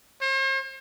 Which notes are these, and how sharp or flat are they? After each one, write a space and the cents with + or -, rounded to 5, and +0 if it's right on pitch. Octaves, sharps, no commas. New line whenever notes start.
C5 +45